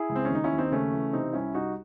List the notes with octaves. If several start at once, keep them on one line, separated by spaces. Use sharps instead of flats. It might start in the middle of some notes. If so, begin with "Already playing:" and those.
Already playing: E4 G#4
C#2
C4
C#4
D#2 D#4
C#4 E4
D#2
C4 D#4
C#3 A3 C#4
E3
C3 C4 D#4
C2 C#4 E4
C2 D#4 F#4